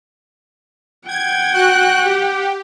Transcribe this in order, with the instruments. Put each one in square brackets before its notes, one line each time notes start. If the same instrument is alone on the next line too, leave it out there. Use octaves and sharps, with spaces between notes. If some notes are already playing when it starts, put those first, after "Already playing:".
[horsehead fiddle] F#5 G5 [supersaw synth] G#6
[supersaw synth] F#4 F#6
G4